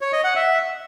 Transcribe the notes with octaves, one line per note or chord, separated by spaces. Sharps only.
C#5
D#5
F#5
E5